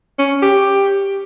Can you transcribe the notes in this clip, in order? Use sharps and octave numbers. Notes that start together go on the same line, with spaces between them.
C#4
G4